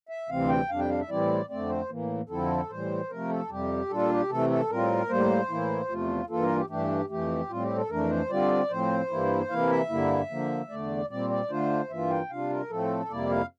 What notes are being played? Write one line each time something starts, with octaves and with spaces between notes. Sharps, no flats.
E5
D2 C3 E3 G3 C4 F5
G5
F2 C3 G3 D4 F5
G5
F5
E5
A2 E3 G3 C4 E4 D5
F2 D3 A3 C4 D5
C5
A2 E3 A#3
F2 D3 F3 C4 E4 A4
A2 E3 G3 C5
C3 F3 A3 A#4
A4
F2 C3 G3 G4
A#2 G3 D4 F4 A4
G4
C3 E3 A3 A4
A4
A2 G3 C4 F4 A#4
A2 G3 A#3 C5
A2 E3 A#3 E4
E2 C3 F3 A3 F4
G2 E3 A#3 F4 A4
A#4
G4
G2 E3 A3 D4 G4
F2 E3 A3 G4
A2 G3 C4 F4
G4
A4
F2 E3 A3 D4 A#4
C5
D3 G3 C4 F4 D5
A2 F3 C4 C5
G2 E3 G3 A#3 E4
C3 E3 A#3 E4 F5
E5
G2 D3 G3 A#3 E4
D3 F3 A#3
E2 D3 A3 D5
A#2 G3 C4 D5
D5
D3 A3 D4 F4 C5
G2 E3 A#3 F4 E5
G5
C3 G3 D4 F4 F5
A#4
A2 F3 A3 C4 A4
F2 C3 G3 A#3 E4 D5
F5